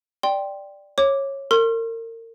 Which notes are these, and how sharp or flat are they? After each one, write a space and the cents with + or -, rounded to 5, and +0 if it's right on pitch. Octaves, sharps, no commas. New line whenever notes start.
D5 +0 G5 +0 C6 +0
C#5 -15 D6 +0
A#4 -35 C6 +40